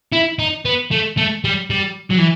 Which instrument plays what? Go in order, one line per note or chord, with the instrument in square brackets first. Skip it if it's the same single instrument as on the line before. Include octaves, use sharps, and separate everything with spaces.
[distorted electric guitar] E4
D#4
B3
A3
A3
G3
G3
F#3
E3